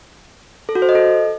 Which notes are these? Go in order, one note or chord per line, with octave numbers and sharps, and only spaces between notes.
A4
F#4
C5
D#5
A4